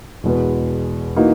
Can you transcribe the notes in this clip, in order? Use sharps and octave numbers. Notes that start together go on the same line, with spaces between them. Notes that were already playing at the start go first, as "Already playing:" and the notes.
E2 B2 G#3 B3
E3 A#3 D#4 F#4